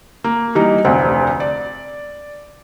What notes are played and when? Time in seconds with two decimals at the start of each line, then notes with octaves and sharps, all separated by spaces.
0.24 A#3
0.55 E3 G3 A#3 D#4
0.85 F1 D2 C4 F#5
1.40 D5